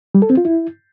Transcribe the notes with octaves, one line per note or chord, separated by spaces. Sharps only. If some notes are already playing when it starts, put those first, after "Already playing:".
G3
A4
C4
F4
E4